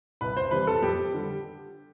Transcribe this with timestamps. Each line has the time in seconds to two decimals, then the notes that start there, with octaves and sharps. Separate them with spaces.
0.21 C2 B4
0.37 C5
0.51 C3 E3 G3 B4
0.67 A4
0.82 F2 G4
1.14 D3 G3